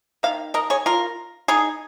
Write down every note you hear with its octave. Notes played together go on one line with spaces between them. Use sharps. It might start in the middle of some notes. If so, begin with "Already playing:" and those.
D#3 A#3 F5
A#4 D#5
G#4 C#5
F4 A#4
D#4 G#4